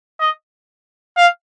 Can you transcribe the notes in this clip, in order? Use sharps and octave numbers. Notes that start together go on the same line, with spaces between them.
D#5
F5